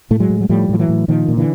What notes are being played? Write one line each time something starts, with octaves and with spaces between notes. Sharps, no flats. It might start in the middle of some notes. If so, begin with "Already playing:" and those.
A2 A3
F#3 G#3
A2
F#3
A2 F3 G3
A2 F3
E3 F#3
A2
A#2 D#3 F3
A#2
D3 E3